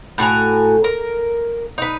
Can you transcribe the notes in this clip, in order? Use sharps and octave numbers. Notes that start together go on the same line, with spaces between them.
A2 F#4 G#5 A#5
A#4
D#4 B4